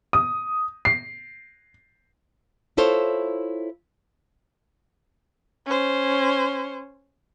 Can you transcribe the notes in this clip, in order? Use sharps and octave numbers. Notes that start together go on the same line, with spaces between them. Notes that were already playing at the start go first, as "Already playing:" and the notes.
D#6
C7
E4 F4 A4 C5 C#5
C#4 C5